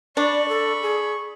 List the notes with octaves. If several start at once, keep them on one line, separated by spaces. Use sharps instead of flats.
D4 D5 B5 C#6
A4
G#4